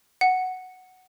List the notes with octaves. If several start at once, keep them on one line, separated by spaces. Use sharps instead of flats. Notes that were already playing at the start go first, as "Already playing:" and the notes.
F#5